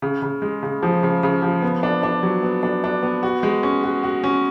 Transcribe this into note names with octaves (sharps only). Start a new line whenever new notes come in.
C#3
C#3
G#3
C#3
F3
C#3
C#3
F3
B3
D4
D4
F#3
B3
D4
D4
B3
F#4
G#3
C#4
F#4
F#4
C#4